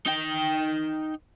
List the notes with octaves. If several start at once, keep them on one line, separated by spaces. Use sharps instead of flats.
D#4 G5